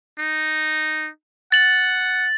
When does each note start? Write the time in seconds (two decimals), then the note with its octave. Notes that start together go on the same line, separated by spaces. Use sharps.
0.19 D#4
1.52 F#5 A6 F#7